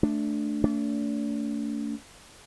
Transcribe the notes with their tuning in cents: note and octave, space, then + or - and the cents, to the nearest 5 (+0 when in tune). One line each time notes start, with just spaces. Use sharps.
A3 +0 D4 +0
A3 +25 D4 -40